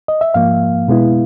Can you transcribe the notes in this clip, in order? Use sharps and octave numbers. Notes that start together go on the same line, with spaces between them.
D#5
E5
G#2 F3 A#3 F5
B2 G#3 B3 E4